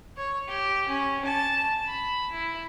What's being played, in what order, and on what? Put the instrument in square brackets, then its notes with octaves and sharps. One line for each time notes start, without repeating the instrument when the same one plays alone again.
[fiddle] C#5
G4
C#4
A5
B5
E4